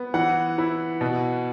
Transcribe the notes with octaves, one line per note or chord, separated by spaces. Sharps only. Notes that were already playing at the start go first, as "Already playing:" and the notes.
Already playing: B3
E3 F#5
E4
B2